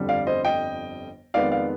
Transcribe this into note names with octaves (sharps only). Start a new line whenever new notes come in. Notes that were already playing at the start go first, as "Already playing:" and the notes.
Already playing: G1 F2 D3 G3
D5 F5
C5 D#5
D#5 G5
F2 D#3 G#3 B3 D5 F5
D5 F5